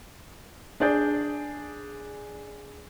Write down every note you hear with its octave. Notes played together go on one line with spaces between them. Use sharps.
D4 G#4 D5 G6